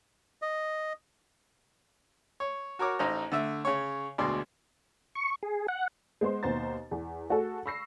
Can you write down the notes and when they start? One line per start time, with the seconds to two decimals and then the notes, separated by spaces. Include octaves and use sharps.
0.42 D#5
2.40 C#5
2.79 F#4 A#4 C#5 D6
2.99 A1 D#4 C5 A#5
3.32 D3 A3 E5
3.65 C#3 C#5
4.18 D2 B2 G#3 D5 C6
5.15 C#6
5.43 G#4
5.68 F#5
6.21 G#3 B3 C5 C6
6.43 D#2 B2 B3 C5 A#5 A6
6.91 E2
7.30 A3 F#4 G#4 A4
7.66 B5 C#6 E6 A#6 C7